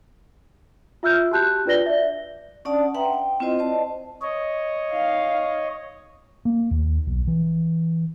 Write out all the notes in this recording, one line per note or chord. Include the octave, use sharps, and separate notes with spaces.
F4 E5 E6 F6 G6
F#4 G4 A5 F#6 G6
D4 F4 B4 D5 A#6 G7
D5 E5
C#4 D4 D5 F#5 A5 D#6
B4 E5 F#5 G5 A#5 C6
G5
C4 E4 F4 C5 D#5
C5 D5 D#5 A5
C#5 D#5
D#4 F5
A#3
D#2
B1
E3